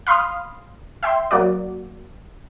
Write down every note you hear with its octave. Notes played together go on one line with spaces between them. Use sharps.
F5 B5 C6 D#6 F6
E5 G5 C6
F#3 A#3 F#4 D5